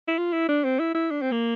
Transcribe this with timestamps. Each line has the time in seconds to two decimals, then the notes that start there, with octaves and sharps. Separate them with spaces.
0.08 E4
0.18 F4
0.33 E4
0.49 D4
0.64 C4
0.79 E4
0.95 E4
1.11 D4
1.22 C4
1.32 A#3